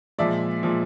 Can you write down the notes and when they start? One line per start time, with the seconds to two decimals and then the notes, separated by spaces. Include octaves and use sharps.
0.18 A#2 F3 G#3 D5 E5
0.63 A#2 F3 G#3